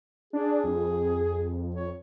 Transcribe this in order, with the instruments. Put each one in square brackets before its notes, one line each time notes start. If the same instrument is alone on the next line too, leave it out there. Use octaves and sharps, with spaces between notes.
[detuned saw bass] D4 [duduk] G#4
[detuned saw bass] F2
[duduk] C#5